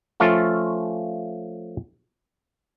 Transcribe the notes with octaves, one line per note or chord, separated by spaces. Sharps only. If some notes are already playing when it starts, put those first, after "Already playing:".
F3 A3 C#4 F4 A4